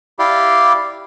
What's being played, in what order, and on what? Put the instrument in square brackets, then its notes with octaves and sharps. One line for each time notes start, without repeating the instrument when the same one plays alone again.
[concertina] E4 G4 D5 F5